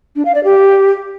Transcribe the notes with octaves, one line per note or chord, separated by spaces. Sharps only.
D4
F5
D5
G4